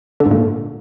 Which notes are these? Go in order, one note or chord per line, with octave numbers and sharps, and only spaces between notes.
D3
G#2
A#2